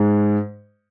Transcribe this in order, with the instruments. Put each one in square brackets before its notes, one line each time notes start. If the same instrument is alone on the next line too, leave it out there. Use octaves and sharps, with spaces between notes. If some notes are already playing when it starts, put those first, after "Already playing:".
Already playing: [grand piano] G#2 G#3